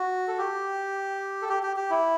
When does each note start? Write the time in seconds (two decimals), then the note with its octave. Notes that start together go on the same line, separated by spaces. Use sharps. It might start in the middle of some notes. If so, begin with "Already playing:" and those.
Already playing: F#4
0.28 A4
0.38 G4
1.42 A4
1.49 G4
1.63 G4
1.77 G4
1.90 E4